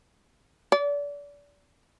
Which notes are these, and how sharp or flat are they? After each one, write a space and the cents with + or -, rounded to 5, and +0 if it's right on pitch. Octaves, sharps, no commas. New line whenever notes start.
D5 -30